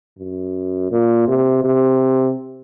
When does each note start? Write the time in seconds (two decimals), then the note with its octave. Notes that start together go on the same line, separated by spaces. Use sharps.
0.18 F#2
0.91 A#2
1.28 C3
1.64 C3